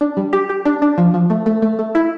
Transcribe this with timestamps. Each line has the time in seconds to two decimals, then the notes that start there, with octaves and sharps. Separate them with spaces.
0.01 D4
0.17 G3
0.33 G4
0.49 G4
0.65 D4
0.82 D4
0.98 F3
1.14 F3
1.30 A3
1.46 A3
1.62 A3
1.79 A3
1.95 E4